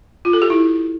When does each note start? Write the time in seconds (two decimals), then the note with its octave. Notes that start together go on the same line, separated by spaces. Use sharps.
0.25 F4
0.33 A4
0.42 G4
0.50 E4